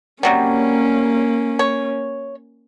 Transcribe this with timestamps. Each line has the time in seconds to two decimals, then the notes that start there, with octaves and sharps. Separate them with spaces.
0.23 C3 F#3 G3 A#3 C#4
1.59 C#5